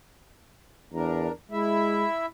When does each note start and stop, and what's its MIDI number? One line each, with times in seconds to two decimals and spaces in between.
0.93 1.28 40
0.93 1.32 62
0.93 1.32 70
1.51 2.06 56
1.51 2.26 64
1.51 2.26 76